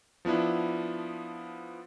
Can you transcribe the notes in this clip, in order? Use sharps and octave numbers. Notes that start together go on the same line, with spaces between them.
F3 B3 D4 E4